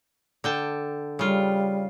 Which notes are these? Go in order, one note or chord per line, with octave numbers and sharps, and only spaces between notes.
D3 G5 A5
C#3 G3 F4